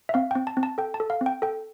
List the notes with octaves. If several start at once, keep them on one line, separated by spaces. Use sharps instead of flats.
E5
C4 F5
G5
C4
A5
C4
A5
A4 G5
A5
A4
F5
C4
G5
A4 G5